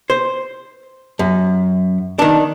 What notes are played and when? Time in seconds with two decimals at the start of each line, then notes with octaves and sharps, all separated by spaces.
0.10 C5
1.19 F#2
2.19 D#3 D4